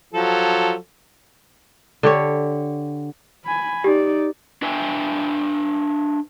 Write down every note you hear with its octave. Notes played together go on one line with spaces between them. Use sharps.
F3 F#3 A4
D3 G4 C#5
G#5 B5
D#4 G4 D5
D4 B4 E5 G5 G#5